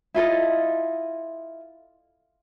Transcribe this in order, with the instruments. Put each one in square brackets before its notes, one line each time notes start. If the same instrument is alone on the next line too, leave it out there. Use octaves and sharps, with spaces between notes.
[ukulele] E4 F4 A4 D#5